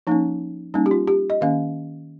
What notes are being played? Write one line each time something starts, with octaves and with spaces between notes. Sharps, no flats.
F3 A#3 C#4 D#4
G3 A#3 C#4 D#4
G4
F4
G4
D#5
D#3 A#3 C#4 F5